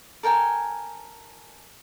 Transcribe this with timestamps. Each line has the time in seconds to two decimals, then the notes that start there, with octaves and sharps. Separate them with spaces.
0.23 A4 A#4 G5 G#5